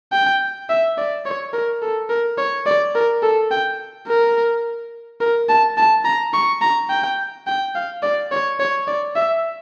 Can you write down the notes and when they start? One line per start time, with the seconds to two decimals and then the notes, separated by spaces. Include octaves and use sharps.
0.12 G5
0.69 E5
0.98 D5
1.25 C#5
1.53 A#4
1.82 A4
2.10 A#4
2.38 C#5
2.66 D5
2.95 A#4
3.23 A4
3.51 G5
4.07 A#4
5.21 A#4
5.49 A5
5.77 A5
6.05 A#5
6.34 C#6
6.61 A#5
6.90 G5
7.47 G5
7.75 F5
8.03 D5
8.32 C#5
8.60 C#5
8.88 D5
9.16 E5